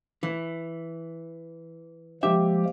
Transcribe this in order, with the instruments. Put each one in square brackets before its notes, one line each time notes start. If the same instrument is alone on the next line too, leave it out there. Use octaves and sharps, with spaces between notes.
[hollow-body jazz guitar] E3
[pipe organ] F3 G#3 A#3 [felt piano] G4 [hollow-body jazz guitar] E5